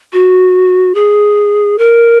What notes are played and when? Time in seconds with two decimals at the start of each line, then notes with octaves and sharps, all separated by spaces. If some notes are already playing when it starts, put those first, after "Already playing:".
0.13 F#4
0.95 G#4
1.78 A#4